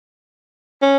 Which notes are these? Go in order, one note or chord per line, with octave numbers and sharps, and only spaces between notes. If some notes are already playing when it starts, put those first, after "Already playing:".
C#4